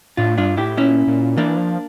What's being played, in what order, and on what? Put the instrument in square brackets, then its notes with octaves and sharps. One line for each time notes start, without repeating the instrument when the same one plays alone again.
[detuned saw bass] A2 [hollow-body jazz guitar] D4 F4
[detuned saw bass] G2 [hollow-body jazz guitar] D4 F4
[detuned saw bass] A2 [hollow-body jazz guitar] E4 G4
[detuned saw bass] A#2 [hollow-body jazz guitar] C#4 E4
[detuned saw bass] A#2
[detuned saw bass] E3 [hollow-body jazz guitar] A#3 D4
[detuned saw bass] F3